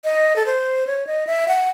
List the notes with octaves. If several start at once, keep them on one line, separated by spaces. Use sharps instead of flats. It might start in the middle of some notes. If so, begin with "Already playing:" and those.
D#5
A4
C5
C#5
D#5
E5
F#5